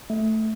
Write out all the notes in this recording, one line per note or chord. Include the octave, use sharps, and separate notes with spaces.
A3